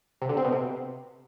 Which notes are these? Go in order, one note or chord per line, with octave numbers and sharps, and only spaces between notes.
C3
D3
C4
B2
C3